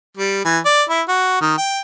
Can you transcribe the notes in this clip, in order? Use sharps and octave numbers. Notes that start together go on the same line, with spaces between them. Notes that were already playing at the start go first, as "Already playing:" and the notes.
G3
E3
D5
E4
F#4
D#3
G5